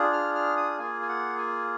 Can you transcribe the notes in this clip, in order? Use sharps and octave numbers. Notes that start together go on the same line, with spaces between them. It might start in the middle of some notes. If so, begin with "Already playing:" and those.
Already playing: D4 F4 G#4
F6
F6
D#6
A#3 F4 G#4 G#5
G#5
F#5
G#5